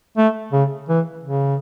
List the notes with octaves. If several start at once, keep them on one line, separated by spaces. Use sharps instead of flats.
A3
C#3
E3
C#3